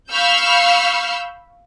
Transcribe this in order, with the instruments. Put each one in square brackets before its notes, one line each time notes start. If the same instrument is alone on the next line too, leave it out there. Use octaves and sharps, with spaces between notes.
[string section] F5 B5 C#6 E6 F6 G6